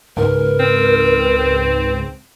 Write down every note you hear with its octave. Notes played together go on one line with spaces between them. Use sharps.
C#2 G#2 A#4 B4
C4